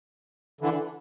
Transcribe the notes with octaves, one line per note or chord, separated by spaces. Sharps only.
D3 E3